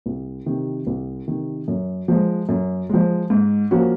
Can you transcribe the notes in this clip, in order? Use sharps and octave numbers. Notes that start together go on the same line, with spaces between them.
C2
C3 D#3
C2
C3 D#3
F#2
F3 G#3
F#2
F3 G#3
G#2
F3 A#3 C#4 F#4